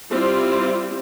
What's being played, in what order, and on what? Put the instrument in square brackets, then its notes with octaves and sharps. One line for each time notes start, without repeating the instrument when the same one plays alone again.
[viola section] G3 C4 E4 F4 G4